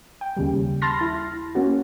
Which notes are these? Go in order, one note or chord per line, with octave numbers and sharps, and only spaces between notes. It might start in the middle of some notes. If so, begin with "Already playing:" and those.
G5
D#2 C#3 G3
A5 B5 C6 F6 A6 A#6
E4
A#3 C#4 F#4